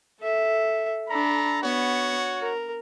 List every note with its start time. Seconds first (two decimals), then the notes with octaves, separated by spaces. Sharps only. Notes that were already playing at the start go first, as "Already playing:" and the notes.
0.20 A4 E5
1.09 D4 A4 A#5 B5
1.63 B3 F#4 C#5
2.41 A#4